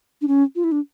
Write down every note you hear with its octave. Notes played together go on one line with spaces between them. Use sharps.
D4
C#4
F4
E4
D4